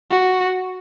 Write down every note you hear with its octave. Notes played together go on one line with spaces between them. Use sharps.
F#4